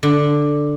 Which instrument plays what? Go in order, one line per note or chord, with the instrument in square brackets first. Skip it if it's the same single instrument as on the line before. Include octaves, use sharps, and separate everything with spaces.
[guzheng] D3